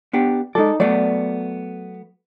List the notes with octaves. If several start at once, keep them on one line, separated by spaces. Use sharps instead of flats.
B3 D4 G4
G#3 D#4 A4 D5
F#3 A3 B3 D5